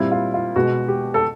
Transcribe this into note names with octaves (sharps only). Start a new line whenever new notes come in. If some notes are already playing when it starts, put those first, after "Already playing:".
Already playing: A#2 G3 C4 E4
F4
F4
B2 G#3 B3 F#4
G4
A4